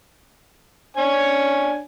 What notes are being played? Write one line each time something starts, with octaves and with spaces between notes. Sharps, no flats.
D4 C#5 G#5